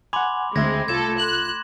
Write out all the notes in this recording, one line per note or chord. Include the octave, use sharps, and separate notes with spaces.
F#5 G#5 B5 C6 D6
D2 G#3 C4 E5 G#6 A#6
C2 A3 F4 A4 G#6 E7
C6 F#6 F#7